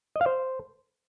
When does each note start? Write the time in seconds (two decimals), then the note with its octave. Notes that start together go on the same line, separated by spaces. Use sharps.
0.16 D#5
0.21 F5
0.26 C5